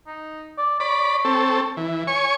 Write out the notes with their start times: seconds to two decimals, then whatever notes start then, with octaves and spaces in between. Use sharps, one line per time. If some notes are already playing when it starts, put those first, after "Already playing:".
0.07 D#4
0.58 D5
0.80 C#5 D5 B5
1.25 C4 A4
1.77 E3
2.07 C#5 G#5 C#6